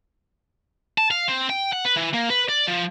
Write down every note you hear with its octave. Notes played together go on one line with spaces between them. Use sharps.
A5
F5
C4
G5
F#5
B4
E3
A#3
B4
D5
F3